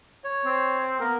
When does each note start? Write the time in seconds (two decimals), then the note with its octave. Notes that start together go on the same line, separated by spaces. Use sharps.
0.24 C#5
0.45 C4
1.00 A#3 B3 A#4